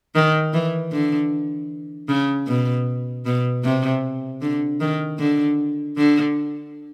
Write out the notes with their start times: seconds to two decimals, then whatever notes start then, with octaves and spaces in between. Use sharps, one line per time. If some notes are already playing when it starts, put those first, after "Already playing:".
0.15 D#3
0.53 E3
0.92 D3
2.08 C#3
2.47 B2
3.26 B2
3.64 C3
4.41 D3
4.81 D#3
5.19 D3
5.97 D3